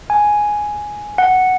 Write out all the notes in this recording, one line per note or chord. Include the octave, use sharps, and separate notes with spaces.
G#5
F#5